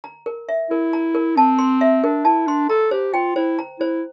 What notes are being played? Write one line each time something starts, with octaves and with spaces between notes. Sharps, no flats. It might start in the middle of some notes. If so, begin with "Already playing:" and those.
A#5
A#4
E5
E4 A#4
A#5
A#4
C4 A5
C6
E5
D4 A#4
E4 A5
D4 C6
A4 A#5
G4 C5
F4 G5
E4 C5
A#5
E4 C5